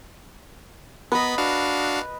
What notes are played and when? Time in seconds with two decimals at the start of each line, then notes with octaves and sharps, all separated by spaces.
1.12 B3 B4 D#5 B5
1.38 D4 F#4 F5